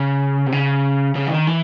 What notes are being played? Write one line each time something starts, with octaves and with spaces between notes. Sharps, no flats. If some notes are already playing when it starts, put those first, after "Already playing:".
Already playing: C#3
C3
C#3
C#3
E3
D#3
E3